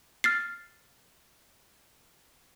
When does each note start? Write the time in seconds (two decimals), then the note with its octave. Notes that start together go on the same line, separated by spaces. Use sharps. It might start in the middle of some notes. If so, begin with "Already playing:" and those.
0.24 F6 A6 C7